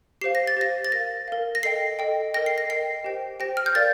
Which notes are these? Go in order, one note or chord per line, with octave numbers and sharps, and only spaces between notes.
G4 C5 F5 C7
A#6
A6
G4 C5 F5 A#6
A6
A#4 F5 A#6
A#4 F5
A#6
A4 D#5 G5 C7
A4 D#5 G5
A#4 D#5 G5 A#6
C7
A#6
A#4 D#5 G5 C7
G4 C5 G5
G4 C5 G5 A#6
F6
G6
A#4 D5 F5 A6